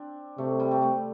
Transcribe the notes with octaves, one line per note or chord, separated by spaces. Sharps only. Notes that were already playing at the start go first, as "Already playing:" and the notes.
Already playing: C4 D4
C3 A3
G3
A3
A3